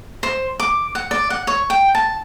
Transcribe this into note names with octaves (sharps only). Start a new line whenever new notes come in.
C5
D6
F#5
D5
F#5
C#5
G5
A5